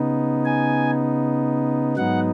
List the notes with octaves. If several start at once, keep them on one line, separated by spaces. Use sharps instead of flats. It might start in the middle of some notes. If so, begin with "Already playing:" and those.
Already playing: C#3 B3 D#4
G#5
G#2 F#3 B3 D#4 F#5